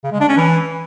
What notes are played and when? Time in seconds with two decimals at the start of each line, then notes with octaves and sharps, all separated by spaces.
0.04 C#3
0.12 G#3
0.20 D4
0.29 C#4
0.37 E3